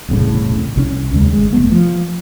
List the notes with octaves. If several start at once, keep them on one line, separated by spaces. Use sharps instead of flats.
E1 C2 A2 C#3
C2 F3 C#4
D#2 C#3 G#3
G#1 G#3
F1 A3 B3
F3